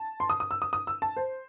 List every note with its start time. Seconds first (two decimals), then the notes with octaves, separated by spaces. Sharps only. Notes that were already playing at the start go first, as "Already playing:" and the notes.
Already playing: A5
0.20 C6
0.30 D#6
0.40 D#6
0.51 E6
0.62 D#6
0.73 D#6
0.87 E6
1.02 A5
1.16 C5